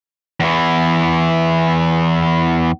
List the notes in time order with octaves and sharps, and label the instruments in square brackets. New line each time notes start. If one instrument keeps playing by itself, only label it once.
[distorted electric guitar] E2 E3